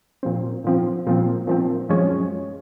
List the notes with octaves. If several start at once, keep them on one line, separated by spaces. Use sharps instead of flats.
A#2 F3 C4
A#2 F3 C4
A#2 F3 C4
A#2 F3 C4
F#2 F3 G#3 C#4